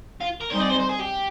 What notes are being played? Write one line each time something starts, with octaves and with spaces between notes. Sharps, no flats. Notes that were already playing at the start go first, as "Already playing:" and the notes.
F4
A#4
G3 C4 D#4 G#4 C5 D#5
D5
C5
C5
G#4
G4